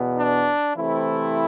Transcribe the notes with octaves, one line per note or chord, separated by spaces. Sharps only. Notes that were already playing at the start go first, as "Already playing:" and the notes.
Already playing: E2 B2 B3
D4
C3 E3 A3 C4 E4